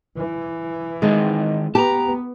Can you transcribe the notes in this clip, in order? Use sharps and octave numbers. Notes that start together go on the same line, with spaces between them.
E3
D#3 G#3 C4 D#4
B3 G4 A5 A#5